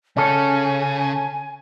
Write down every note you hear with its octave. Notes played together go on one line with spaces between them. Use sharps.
C#3 C#4 A4 G#5